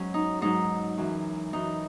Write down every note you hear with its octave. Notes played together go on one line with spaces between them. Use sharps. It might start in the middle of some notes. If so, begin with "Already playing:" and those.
Already playing: G#2 F#3 C#4
D#4
G#2 F#3 D#4
F#2 E3
F#2 E3 D#4